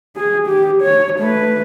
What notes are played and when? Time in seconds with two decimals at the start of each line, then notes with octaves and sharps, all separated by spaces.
0.17 G#4
0.47 G4
0.82 C#5
1.19 A3 B4